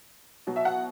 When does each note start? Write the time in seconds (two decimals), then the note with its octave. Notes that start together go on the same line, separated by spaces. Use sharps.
0.47 B2 F#3
0.56 E5
0.65 F#5